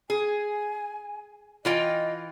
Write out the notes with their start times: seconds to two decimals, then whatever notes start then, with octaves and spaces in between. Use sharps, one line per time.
0.10 G#4 G#5
1.65 E3 F4 D#5 G5